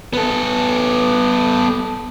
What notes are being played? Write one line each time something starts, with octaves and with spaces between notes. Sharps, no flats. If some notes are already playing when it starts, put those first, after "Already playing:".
B3 A4